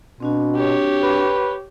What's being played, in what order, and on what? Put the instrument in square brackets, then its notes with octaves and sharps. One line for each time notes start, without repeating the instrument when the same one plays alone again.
[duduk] B2 [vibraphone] C4 D4 F#4
[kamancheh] G4 C#5
[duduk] B4